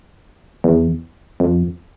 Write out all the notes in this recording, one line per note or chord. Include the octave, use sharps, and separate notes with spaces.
E2
F2